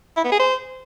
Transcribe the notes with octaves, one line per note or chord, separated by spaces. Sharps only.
E4
B3
G#4
C5